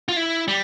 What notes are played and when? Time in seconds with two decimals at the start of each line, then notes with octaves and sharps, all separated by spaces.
0.08 F4
0.17 E4
0.48 G3